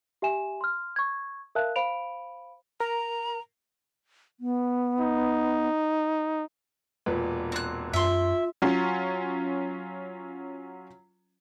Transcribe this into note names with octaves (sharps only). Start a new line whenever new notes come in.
G4 E5 G#5 E7
C6 F6
C#6 G#6
A#4 E5 F5 A5 F#6
C5 F5 B5 D7 F7
A#4 A#5
B3
D#4
E1 A#2 B4
C4 F#6
F#2 F4 E5 C6
F#3 C#4 F4